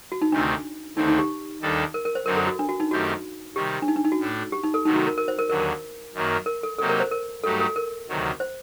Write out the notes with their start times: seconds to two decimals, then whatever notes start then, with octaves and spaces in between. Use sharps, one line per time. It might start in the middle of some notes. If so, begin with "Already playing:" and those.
0.12 F#4
0.22 D#4
0.32 D2 C3 D#3 A3 C4 D4
0.96 D#2 D3 A3 C4 D#4
1.08 D#4
1.19 G4
1.61 D#2 D#3 G3 D4 A4
1.94 A#4
2.05 A#4
2.15 C5
2.26 F#2 D3 F#3 C4 D#4 A#4
2.36 A4
2.47 F#4
2.59 D4
2.69 F#4
2.80 D#4
2.91 F#2 D#3 A3 C4 F#4 G4
3.55 C3 D#3 G3 G4
3.82 D4
3.88 D#4
3.96 D4
4.05 D#4
4.12 F#4
4.20 A2 A3 D4
4.52 G4
4.63 D#4
4.74 A4
4.85 C3 D#3 F#3 A3 D#4
4.96 F#4
5.07 A#4
5.18 A#4
5.28 C5
5.39 A#4
5.49 D#2 D3 F#3 A#4
5.60 A#4
6.14 F#2 D#3 F#3 A#3
6.46 A#4
6.63 A4
6.78 C3 F#3 A#3 D#4 G4 A4
6.89 A#4
7.00 C5
7.11 A#4
7.43 G2 F#3 A3 D#4 G4 A4
7.60 A4
7.76 A#4
8.08 D2 C3 D#3 F#3
8.40 C5